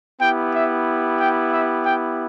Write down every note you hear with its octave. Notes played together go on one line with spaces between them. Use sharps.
B3 E4 G4 G5
E5
G5
E5
G5